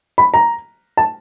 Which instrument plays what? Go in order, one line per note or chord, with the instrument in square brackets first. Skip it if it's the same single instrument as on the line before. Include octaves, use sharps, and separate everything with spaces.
[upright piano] B5
A#5
A5